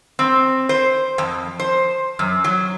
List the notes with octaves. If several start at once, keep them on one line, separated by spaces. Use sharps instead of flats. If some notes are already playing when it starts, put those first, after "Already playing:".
C4
C5
F2
C5
F#2
F#3